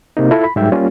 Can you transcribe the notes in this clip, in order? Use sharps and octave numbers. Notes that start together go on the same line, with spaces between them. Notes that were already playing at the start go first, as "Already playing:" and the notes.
C3 A#3 D#4
E4 F4 A4 E5
B5
G#2 F#3 G3 E5 G5
G3 A#3 C#4 F4